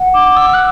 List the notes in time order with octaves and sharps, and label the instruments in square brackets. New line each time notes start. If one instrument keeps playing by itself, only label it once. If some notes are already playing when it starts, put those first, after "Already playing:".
Already playing: [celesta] F#5
[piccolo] D6
E6
F#6